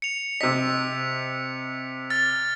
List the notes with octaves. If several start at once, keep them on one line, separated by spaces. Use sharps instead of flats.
C#7 F7
C3 D#5 B6
F6 A6